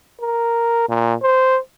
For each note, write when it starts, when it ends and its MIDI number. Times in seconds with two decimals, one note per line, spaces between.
0.21 0.87 70
0.89 1.15 46
1.22 1.58 72